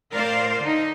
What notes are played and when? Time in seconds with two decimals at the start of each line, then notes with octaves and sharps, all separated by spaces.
0.12 A2 A#4 C5 D5 F5
0.60 D3 D#4